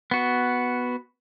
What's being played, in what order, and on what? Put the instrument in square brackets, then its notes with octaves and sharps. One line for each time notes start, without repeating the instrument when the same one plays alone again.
[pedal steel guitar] B3 F#4